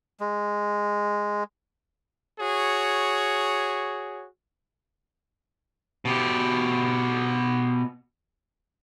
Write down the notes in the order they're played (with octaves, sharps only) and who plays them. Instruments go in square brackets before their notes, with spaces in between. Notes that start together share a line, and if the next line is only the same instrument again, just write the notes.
[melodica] G#3
[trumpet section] F#4 G#4 C#5
[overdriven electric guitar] B2 G4